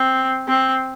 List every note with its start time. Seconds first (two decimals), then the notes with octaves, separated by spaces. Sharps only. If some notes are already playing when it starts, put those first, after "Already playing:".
Already playing: C4
0.48 C4